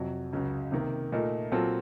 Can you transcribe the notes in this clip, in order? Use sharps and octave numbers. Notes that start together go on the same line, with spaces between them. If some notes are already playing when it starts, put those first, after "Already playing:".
Already playing: F2 C3 F#3
C#2 C#3 F#3
C3 D#3 A#3
A#2 A3 D#4 A#4
A#2 F#3 C4 F4 A4